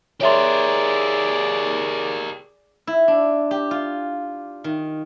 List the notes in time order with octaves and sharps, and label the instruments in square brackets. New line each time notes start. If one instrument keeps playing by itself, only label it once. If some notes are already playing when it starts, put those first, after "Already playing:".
[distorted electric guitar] G4 A#4 [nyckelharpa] G#4 D5 [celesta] C#5 E5 C6
[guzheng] E4
D4
G4
F4
D#3